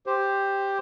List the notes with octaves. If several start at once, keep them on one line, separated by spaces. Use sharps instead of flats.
G4 C5